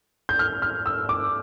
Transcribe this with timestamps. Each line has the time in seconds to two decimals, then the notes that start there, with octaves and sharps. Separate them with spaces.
0.29 G6
0.39 F6
0.62 F6
0.86 E6
1.09 D6